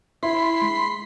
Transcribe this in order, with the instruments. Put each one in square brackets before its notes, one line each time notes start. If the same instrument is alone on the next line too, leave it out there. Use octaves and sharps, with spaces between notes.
[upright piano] E4 [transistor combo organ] B5 C6
[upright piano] G#3